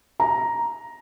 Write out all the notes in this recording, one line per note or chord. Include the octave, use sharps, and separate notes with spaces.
A#5